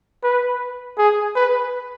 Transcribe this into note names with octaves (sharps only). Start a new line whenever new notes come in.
B4
G#4
B4